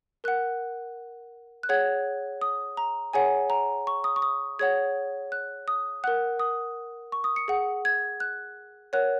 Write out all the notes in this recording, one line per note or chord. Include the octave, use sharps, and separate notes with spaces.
A#4 F#5 F#6
F#6
G#4 C#5 F#5 G#6
D#6
A#5
G#4 C#5 F#5 G#5
A#5
C#6
D#6
C#6
D#6
G#4 C#5 F#5 G#6
F#6
D#6
A#4 F#5 F#6
D#6
C#6
D#6
C#7
G#4 F#5
G#6
F#6
A#4 C#5 F#5 F#6